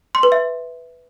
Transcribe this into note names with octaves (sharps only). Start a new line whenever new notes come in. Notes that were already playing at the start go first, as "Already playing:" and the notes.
C6
B4
E5